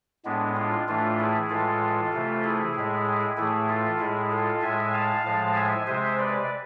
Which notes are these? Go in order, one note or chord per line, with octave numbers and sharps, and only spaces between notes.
A2 G#3 B3 D4
D4 F4
A2 E3 A3 D4 F4
E4 G#4
A2 E3 G#3 F4 A4
C3 E3 A3
E4 G#4
A2 G#3
A2 E3 A3 E4 G#4
F4 A4
A2 G#3 E4 G#4
F4 A4
A2 G#3 E5 G#5
F5 A5
A2 F3 G#3
E5 G#5
C3 G#3 C5 E5
B4 D5